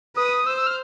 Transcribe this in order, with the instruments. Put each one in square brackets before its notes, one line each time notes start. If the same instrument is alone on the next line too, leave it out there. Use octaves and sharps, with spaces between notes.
[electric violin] B4 [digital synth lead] D#6
[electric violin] C5 [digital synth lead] E6
[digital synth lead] E6
F6